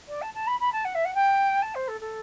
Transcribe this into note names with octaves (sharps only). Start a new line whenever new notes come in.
D5
A5
A5
B5
B5
A5
F#5
E5
F#5
G5
A5
C5
A4
A4